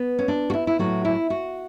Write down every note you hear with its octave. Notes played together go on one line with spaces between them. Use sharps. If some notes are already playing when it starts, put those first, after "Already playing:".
Already playing: B3
C#4
D4
F#4
E4
E4
A2 F#3 A3 F#4
E4
F#4